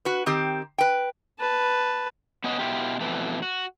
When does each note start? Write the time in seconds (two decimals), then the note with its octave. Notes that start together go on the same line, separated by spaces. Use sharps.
0.05 F#4 B4
0.26 D#3 C4 G4
0.78 B4 G5
1.40 B4 A5
2.44 B3 C#4 F#4 D#5
2.59 B2 E4 F4 G4
3.00 F2 B2 E3 A3
3.42 F#4